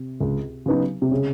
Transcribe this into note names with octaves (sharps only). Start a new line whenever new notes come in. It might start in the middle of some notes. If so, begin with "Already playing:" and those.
Already playing: C3
C#2
C#3 F#3 B3 D#4
C3
C#3